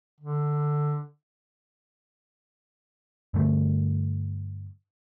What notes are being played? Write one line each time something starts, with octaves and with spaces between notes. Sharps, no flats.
D3
G2 D3 A3